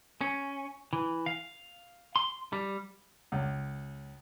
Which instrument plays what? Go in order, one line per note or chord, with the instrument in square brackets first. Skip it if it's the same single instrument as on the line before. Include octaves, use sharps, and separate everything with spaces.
[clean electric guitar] C#4
E3
F5
C6
G3
[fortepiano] C#2